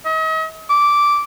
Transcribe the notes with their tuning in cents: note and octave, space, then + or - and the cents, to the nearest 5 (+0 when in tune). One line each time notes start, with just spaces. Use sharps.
D#5 +40
D6 -10